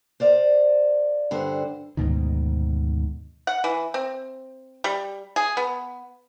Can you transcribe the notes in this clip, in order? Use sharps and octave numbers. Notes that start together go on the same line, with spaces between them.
C5 D5 F5
G2 D3 C5
D2 G#2 B2 D#3
F#5
E3
C4
G3
G#4
B3